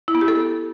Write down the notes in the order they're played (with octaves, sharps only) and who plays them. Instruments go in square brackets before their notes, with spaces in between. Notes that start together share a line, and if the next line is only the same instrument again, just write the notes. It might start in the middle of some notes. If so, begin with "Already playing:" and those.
[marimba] E4
B3
G4
A4